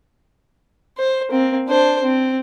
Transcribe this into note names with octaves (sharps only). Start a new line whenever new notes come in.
C5
A#3 C4
D4 C5
C4